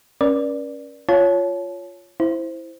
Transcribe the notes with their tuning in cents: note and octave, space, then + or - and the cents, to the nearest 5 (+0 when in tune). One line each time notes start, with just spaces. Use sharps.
C#4 +0 B4 -45 D5 +0
F4 +0 C#5 +10 A5 -30
E4 +0 C5 +0